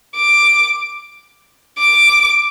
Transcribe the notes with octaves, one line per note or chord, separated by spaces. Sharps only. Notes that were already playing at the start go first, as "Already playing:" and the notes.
D6
D6